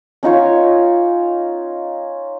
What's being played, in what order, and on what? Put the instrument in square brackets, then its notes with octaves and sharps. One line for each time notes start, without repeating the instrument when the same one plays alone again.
[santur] C#4 D#4 F4 C#5